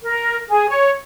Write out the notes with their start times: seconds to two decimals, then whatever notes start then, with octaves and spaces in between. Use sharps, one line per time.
0.04 A#4
0.49 G#4
0.69 C#5